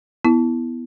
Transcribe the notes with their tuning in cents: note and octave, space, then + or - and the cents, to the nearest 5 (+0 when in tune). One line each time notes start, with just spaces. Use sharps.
B3 +0 E4 +0